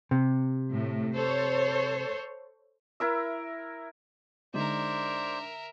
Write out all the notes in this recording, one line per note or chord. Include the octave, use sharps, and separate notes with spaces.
C3
A2
A4 C5 C#5
E4 A#4 E5
D3 G#3 D#4 A#4 C5 D5 E5